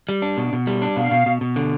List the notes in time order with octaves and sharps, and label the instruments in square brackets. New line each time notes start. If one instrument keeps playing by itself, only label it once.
[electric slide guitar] G3
D4
B2
B2
G3
D4
[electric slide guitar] B2 [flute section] F5
[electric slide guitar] B2
B2
B2
D3